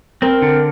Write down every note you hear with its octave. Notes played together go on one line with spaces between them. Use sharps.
C4 A#4
D3